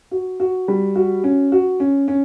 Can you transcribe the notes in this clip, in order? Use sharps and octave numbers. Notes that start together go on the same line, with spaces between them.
F#4
F#4
G3
F#4
C#4
F#4
C#4
C#4